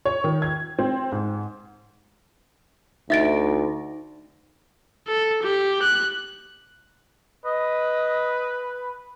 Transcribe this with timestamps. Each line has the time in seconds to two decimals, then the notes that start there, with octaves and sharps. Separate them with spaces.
0.05 C#5
0.24 D#3
0.42 G#6
0.79 C4
1.12 G#2
3.10 D2 D#4 E5 A6 D7
5.08 A4
5.43 G4
5.83 F#6
7.46 B4 D#5